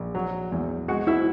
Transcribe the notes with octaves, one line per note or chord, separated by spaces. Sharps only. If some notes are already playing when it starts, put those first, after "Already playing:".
Already playing: A#1
F#3
E2
G#3 F#4 F#5
E4 E5